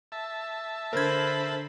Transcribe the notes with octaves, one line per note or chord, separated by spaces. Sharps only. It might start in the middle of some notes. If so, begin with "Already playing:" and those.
E5 A5
D3 A#4 C5 B5 G#6